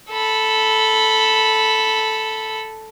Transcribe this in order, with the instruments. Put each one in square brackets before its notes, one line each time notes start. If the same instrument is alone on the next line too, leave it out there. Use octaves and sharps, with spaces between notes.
[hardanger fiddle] A4 B5